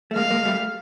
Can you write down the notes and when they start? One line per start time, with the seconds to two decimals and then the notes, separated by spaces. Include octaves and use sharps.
0.11 A3
0.16 G#3 A#3 F5
0.31 G#3 A#3
0.45 G3 A3